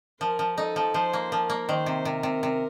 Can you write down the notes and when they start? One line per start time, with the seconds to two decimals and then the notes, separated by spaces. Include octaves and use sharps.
0.21 F3 A#4
0.39 F3
0.57 D#4 A4
0.76 F3
0.94 F3 C5
1.13 A#3
1.31 F3 A#4
1.50 A#3
1.68 D#3 C5
1.86 C3
2.05 C3 A#4
2.23 C3
2.43 C3